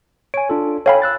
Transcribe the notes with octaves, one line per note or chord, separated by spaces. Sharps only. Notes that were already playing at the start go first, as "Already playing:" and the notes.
C#5 G#5 D7
D4 F4 A4
A4 C#5 F5 G5 G#5 B5
E6 F#6 A6